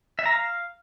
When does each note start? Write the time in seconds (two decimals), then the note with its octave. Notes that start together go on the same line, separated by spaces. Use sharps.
0.19 E5
0.26 A#5
0.32 F5